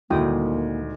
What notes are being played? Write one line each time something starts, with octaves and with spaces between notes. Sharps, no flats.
D#1 D2 G#3 A#3 E4 G5 D#6